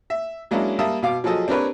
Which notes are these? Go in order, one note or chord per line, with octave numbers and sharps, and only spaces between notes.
E5
F#3 G#3 A#3 C#4 D4 E4
G3 A#3 E5 A5 D#6
B2 F5 D6
F3 F#3 G#4 A4 D#5
C4 D4 G4 A#4 B4 C#5